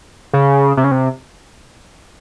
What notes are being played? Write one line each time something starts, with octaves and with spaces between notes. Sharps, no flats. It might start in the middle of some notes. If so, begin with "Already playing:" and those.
C#3
C3
C#3
C3